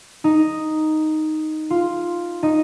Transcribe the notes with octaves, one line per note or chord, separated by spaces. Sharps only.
D#4
F4
D#4